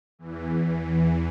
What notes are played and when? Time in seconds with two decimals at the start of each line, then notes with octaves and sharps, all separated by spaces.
0.19 E2 E3
0.82 E2 E3